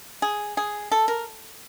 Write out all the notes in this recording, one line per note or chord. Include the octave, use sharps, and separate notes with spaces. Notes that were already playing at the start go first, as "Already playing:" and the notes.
G#4
G#4
A4
A#4